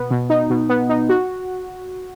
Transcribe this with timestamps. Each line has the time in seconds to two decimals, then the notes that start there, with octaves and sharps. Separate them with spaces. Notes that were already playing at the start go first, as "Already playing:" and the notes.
Already playing: B2 B3
0.11 B2
0.30 D#4
0.50 B2
0.69 B3
0.89 D#4
1.09 F#4